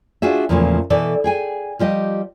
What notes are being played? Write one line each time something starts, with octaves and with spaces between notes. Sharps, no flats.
D4 F4 F#4 G#4 E5
E2 A#2 C#3 F3 F#3 A3
B2 E3 A4 D5
G#4 G5 G#5
F3 G3 G4 D#5